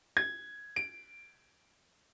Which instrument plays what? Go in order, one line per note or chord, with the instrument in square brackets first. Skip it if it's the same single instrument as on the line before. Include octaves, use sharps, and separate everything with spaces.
[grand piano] G#6
D7